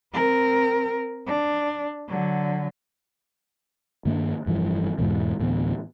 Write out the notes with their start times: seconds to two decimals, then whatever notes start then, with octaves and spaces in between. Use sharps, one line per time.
0.14 C4 A#4
1.27 D4
2.09 D3 F#3
4.05 G2 D#3 A#3 D4
4.46 F1 G2 E3 F3
4.98 E2 G#2 B2 E3
5.40 D2 A2 E3 B3